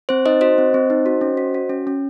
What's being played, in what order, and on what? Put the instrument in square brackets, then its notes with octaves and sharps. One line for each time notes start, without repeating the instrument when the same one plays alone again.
[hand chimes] C4 C5
D#4 C5 D#5
F#4 C5 D#5
C4
C4
D#4
F#4
C#4
F#4
F#4
C#4
C#4